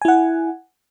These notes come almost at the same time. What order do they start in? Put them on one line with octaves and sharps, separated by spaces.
G#5 E4 F#5